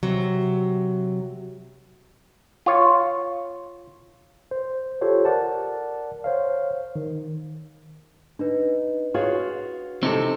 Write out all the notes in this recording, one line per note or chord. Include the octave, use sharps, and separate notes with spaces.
C3 F#3
F4 C#5
C5
F4 G4 A4 C5 C#5
A#4 D5 F#5 A5
C5 C#5 F5
D#3
D4 D#4 B4
F4 F#4 G#4 C#5
C3 A3 C4 D#4 A4